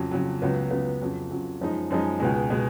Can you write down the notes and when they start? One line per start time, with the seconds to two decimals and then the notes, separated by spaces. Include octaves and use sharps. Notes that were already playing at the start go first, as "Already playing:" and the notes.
Already playing: F2 C#3 F#3
0.11 F2 C#3 F#3
0.42 C#2 C#3 F#3 B3
0.71 C#2 C#3 F#3 B3
1.02 F2 C#3 F#3
1.31 F2 C#3 F#3
1.61 F#2 F3 G#3 D#4
1.90 F#2 F3 G#3 D#4
2.20 C#2 B2 G#3
2.50 B2 G#3